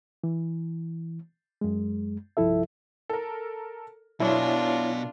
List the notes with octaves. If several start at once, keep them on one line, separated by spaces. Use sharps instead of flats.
E3
F#2 G#3
C2 G2 F3 E4 A4 E5
A4 A#4
F#2 B2 B3 D4 E4 F4 C#5